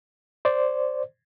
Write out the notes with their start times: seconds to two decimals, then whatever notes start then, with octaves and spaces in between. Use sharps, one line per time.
0.45 C5 D5